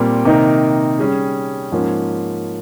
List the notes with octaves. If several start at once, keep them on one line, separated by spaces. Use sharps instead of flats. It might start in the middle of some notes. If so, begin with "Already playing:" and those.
Already playing: A#2 G3 C4 G4 A#4
C3 D#3 A#3 D#4 A#4
G3 C#4 G#4
G#2 F3 A#3 C#4